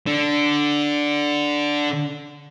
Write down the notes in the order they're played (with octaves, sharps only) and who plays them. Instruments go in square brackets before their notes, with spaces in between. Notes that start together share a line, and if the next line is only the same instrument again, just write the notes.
[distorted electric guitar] D3 D4